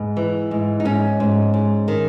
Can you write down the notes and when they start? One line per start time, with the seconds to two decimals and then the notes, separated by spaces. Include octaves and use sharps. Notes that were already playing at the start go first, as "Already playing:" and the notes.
Already playing: G#2 B4
0.17 E3
0.51 G#2
0.80 D#4
0.85 G#2 C#4
1.20 G#2
1.54 G#2
1.88 D#3